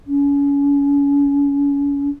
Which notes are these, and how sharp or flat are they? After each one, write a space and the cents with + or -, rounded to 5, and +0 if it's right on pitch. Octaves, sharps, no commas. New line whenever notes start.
C#4 +35